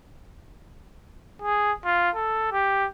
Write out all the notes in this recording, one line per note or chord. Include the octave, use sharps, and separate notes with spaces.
G#4
F4
A4
G4